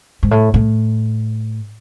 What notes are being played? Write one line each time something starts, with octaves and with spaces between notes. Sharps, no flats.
G#2
A2
A2